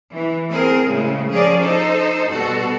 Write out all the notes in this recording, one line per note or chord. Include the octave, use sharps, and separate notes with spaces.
E3
C4 G#4 A#4
A2 C#3 G#3
F3 C#4 G#4 A#4 D5
D#4 A4 C5
G2 B2 F#4 A4